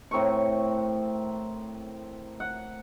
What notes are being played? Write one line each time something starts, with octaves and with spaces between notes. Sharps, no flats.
A2 C4 A#4 C#6
F#5